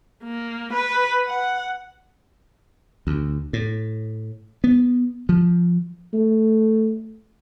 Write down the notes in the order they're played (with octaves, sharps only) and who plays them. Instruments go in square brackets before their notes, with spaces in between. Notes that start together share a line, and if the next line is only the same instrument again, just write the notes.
[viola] A#3
B4
F#5
[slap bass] D2
A2
B3
F3
[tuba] A3